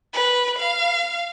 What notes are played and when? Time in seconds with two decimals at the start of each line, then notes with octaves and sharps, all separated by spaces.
0.14 B4
0.58 F5